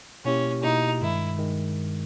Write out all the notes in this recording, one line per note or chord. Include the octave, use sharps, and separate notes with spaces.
B2 A#3 C#4 E4 G4
B2 A#3 D#4 E4 G4
G2 D#3 G#3 E4
D#3 G#3